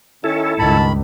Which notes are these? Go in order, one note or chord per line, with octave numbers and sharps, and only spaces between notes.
D#3 C#4 E4 A4
C#2 G2 D#3 A5 B5